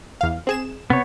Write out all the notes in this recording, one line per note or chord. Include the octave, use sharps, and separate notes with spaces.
E2 F5
C4 G#4 E7
C3 B3 C#5